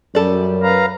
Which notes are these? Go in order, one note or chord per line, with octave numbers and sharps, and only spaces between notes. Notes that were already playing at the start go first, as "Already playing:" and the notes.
F#2 G3 A4 D5
B4 F5 A#5